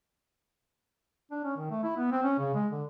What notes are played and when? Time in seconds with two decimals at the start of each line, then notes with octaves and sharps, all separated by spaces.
1.31 D4
1.44 C#4
1.57 D#3
1.70 A3
1.83 E4
1.97 B3
2.12 C4
2.23 C#4
2.39 C#3
2.54 G#3
2.72 D3